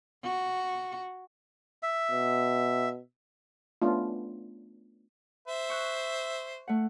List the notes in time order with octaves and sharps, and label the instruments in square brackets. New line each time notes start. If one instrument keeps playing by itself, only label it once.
[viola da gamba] F#4
[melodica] E5
[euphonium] B2
[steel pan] A3 B3 C#4 D4 F4
[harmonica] C5 E5
[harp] C#6 F#6
A3 F#5